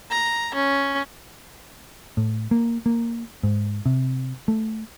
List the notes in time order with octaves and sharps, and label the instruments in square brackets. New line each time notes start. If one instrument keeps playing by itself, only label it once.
[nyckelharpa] A#5
C#4
[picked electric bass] A2
A#3
A#3
G#2
C3
A3